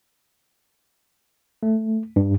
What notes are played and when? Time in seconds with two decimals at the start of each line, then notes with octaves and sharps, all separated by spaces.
1.63 A3
2.16 G2